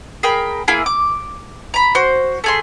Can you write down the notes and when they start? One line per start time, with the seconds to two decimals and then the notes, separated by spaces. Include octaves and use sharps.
0.23 G#4 A#4 G5 B5
0.68 A#3 E4 F4 G#4
0.86 D6
1.74 A#5 B5
1.95 F#4 C5
2.44 A3 G#4 C6